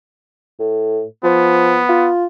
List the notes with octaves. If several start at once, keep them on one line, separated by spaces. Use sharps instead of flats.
A2
F3 B3
F4